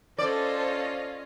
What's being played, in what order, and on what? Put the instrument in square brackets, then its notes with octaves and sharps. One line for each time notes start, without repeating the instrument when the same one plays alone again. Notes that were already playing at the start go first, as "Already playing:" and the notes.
[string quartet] C#4 F4 D#5 [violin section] A4 C5 [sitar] D5